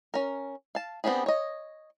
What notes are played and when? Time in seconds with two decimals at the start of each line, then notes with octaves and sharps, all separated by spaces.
0.14 C#4 A#4
0.75 F5 A5
1.04 B3 C4 D4 G4 G#4
1.26 C#5 D#5